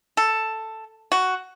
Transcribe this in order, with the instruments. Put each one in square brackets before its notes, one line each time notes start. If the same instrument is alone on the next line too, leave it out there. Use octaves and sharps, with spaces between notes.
[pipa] A4
F#4